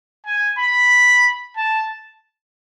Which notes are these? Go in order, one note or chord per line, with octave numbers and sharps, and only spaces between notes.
G#5
B5
A5